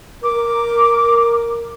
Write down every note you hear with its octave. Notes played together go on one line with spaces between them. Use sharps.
A#4 D6